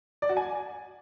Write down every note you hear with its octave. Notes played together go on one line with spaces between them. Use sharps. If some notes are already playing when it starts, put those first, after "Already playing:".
D5
F#4
G#5